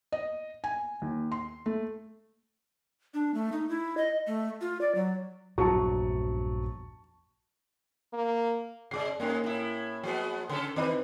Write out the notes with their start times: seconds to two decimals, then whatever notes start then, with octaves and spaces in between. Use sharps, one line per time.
0.12 D#5
0.64 G#5
1.02 D#2
1.32 C6
1.66 A3
3.14 D4
3.34 A3
3.52 D#4
3.69 E4
3.97 D#5
4.27 A3
4.61 F4
4.81 D5
4.95 F#3
5.58 A#1 E2 G2 F#3 A5 C#6
8.13 A#3
8.91 C3 G#3 D5 D6 C7
9.20 G2 G#3 A#3 C#4
9.44 A2 E4
10.03 F3 G#3 B3
10.49 C#3 C#4 A4
10.76 D#3 C4 D#4 B4